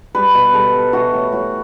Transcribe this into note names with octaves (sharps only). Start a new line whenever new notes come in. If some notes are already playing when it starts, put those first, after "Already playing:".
G3 B4
B2
G3 A4
G3
E3 F#4
A2
A2 F#4